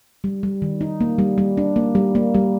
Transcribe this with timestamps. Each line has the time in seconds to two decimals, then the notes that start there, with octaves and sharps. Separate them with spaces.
0.24 G3
0.43 G3
0.62 D#3
0.81 D#4
1.01 A#3
1.18 G3
1.38 G3
1.57 D4
1.76 A#3
1.95 G3
2.15 A#3
2.34 G3